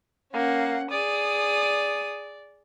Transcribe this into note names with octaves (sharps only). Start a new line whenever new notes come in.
A#3 C#4 F#5
G#4 D5 D#6